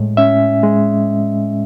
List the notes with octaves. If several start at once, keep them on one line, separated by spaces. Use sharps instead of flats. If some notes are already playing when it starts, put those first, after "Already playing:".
Already playing: A2 G#3
C#4 E5
G#3